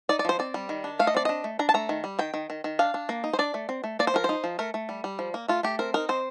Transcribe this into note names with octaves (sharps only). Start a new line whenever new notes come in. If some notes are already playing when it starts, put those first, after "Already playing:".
D#4 D5
D5
F3 C5
C4 D5
G3
D#3
D4
A3 F5
D#5
C4 D5
D4 D#5
A3
D4 A#5
A5
A3 A#5
D#3
G3
D#3 G5
D#3
D#3
D#3
D4 F5
D4
A#3
D#4
C5
D4 D5
A3
C4
A3
A#3 D5
C5
F3 A#4
D#4 C5
F3
A3 A#4
A3
G3
G3
F3
A#3
A3 F4
A3 G4
C4 A#4
D#4 A#4
C4 C5